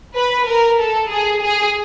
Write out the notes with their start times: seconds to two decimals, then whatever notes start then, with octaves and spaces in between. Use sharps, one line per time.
0.16 B4
0.47 A#4
0.80 A4
1.12 G#4
1.43 G#4